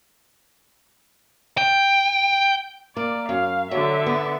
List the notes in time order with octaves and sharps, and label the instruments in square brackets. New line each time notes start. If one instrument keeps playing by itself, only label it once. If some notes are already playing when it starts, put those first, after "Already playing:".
[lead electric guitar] G5
[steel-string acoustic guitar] A#3 [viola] D5
[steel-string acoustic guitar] F#2 [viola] F5
[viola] D3 E5 [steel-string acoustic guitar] F#3
[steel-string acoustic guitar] B3